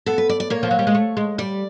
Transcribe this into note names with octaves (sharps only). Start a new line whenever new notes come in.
B3 A4
B4
D5
D5
A#3 C#5
F3
F#3
G3
G#3
A3
G#3
G3 D5